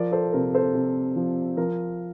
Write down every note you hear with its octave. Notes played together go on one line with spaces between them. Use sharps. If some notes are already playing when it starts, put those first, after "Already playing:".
Already playing: F3 A#4 D5
A4 C5
C3 A#4
A4 C5
C3
F3
F3 A#4